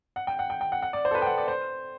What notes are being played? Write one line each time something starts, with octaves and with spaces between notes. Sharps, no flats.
F#5
G5
F#5
G5
G5
F#5
F#5
D5
C5
A4
B4
G5
F#5
D5
C5